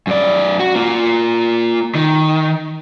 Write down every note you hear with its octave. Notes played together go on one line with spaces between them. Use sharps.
F#2 D5
F#4
A#3 F4
D#3